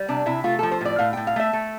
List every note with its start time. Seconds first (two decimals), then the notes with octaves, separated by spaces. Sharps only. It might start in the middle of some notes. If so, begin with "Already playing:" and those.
Already playing: G3
0.08 C3 D4
0.26 C3 E4
0.44 A3 F4
0.59 F3 A4
0.72 C5
0.81 A2 D5
0.99 A2 F5
1.13 A2 G5
1.27 F5
1.36 A3 E5
1.53 A3